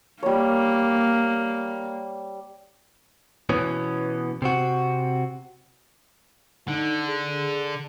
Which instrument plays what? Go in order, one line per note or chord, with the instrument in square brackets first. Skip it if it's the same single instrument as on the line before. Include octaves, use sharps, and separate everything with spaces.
[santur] G3 C#5 [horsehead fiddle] A#3
[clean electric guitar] B2 E3 B3 C#4
C3 C4 F#4
[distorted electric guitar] D3 [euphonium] D#4
[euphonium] G#4